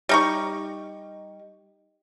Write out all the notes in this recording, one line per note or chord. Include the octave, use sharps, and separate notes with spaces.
G3 D#4 C#6